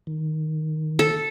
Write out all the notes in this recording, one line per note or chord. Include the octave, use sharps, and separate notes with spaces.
D#3
A4